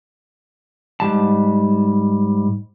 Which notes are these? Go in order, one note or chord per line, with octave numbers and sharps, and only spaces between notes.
G#2 G3 A5